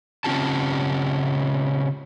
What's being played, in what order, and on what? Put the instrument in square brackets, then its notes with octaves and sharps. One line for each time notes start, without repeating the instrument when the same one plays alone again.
[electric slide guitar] C#3 C4 C#4 F4 G4 A5